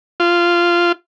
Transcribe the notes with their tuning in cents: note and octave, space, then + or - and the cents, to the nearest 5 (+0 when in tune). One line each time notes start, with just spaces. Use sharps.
F4 -10